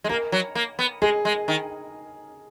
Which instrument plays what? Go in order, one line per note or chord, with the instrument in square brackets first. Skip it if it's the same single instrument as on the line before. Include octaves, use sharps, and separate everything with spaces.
[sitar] G#3
[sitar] A#3 [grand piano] A#4
[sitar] F#3
A#3
B3
[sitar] G#3 [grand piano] G#4
[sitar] G#3
D#3